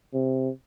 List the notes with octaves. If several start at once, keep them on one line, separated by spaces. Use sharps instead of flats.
C3